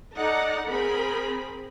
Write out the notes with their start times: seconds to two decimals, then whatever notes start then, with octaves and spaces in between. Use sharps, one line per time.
0.16 D#4 A4 D5 F#5 A#5
0.68 C4 G#4 A#4 B5